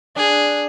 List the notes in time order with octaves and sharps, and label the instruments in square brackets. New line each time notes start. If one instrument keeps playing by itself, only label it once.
[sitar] D4 [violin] G#4